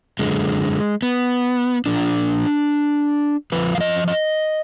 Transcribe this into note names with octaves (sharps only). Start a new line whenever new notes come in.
F#2 D3 G#3
B3
A#2 F3 D4
F2 F3 B4
F5
D#5
D#5